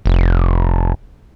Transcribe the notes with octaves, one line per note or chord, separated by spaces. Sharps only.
F1